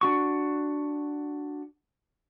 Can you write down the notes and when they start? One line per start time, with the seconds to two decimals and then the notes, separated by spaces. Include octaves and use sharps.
0.01 D4 F#4 C#6